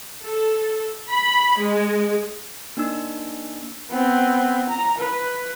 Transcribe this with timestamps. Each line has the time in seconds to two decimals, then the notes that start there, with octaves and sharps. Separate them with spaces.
0.23 A4
1.10 B5
1.59 G#3
2.77 A#3 D4 D#4 E6
3.91 B3 C4
4.69 A#5
4.98 B4